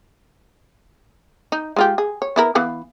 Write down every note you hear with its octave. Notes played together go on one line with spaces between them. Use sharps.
D#4
G#3 F4 G4
G#4
C#5
B3 E4 A#4
E3 B3 F5